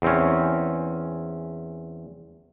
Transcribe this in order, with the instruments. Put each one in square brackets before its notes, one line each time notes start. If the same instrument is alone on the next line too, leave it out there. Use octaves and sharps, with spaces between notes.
[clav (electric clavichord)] E2 C4 C#4